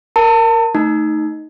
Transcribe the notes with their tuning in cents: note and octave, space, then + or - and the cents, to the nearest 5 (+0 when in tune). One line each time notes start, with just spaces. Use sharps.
A#4 +0 A5 +35
A3 +0 D#4 +0